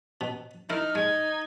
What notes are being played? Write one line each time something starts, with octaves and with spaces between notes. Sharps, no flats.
B2
D#4 E4 A#4 F6
G#3 G#6